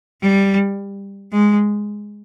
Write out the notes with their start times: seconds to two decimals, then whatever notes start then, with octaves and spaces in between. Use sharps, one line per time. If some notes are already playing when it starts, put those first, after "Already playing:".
0.22 G3
1.33 G#3